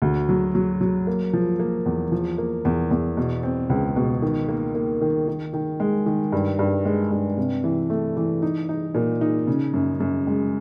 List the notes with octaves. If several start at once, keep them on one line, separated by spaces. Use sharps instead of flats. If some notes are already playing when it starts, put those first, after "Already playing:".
D2
F#3
F#3
F#3
A#3
F3
A#3
E2
F3
A#3
E2
E2
B2
C4
C#2
B2
D#3
A#3
A#3
D#3
D#3
D#3
G#3
D#3
G2
G2
G#3
G2
C3
E3
A3
E3
D#4
D#4
A#2
D#4
C#3
F#2
F#2
G#3